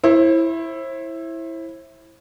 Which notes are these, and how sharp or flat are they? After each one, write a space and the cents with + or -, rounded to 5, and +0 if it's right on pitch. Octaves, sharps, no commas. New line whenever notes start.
E4 +0 C5 +40